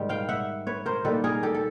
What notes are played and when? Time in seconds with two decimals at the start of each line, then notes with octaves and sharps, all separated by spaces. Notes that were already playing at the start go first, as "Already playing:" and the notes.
Already playing: G#2 D#3 G3
0.09 F5 G5
0.29 E5 F#5
0.67 B4 C#5
0.86 A#4 C5
1.05 D#3 G3 A#3 A4 B4
1.24 G#4 A#4
1.43 G4 A4
1.55 A4